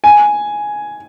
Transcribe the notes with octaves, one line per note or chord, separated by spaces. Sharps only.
G#5